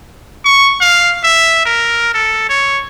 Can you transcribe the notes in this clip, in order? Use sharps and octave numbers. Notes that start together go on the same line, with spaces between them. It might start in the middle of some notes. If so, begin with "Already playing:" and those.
C#6
F5
E5
A#4
A4
C#5